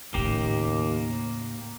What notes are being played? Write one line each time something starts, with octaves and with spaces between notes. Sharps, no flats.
D#2 A2 C#3 A#3 G4